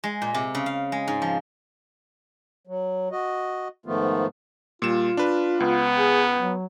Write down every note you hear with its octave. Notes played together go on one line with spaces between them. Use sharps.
G#3
A#2
C3
C#3
F5
G#3
G#2
F3
F#3
F#4 D#5
G#2 D#3 F3 A3 B3 F4
A#2 G3 F4 E7
D4 B4
C#2 B3
G#4
F#3